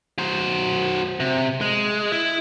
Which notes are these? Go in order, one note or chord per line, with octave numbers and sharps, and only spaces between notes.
F#3 C5
C3
G#3
E4